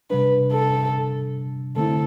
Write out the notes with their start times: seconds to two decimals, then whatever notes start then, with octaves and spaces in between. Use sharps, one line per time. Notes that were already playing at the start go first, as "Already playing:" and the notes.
0.10 C3 G3 D4 B4
0.51 A4
1.76 D3 A3 C4 E4 A4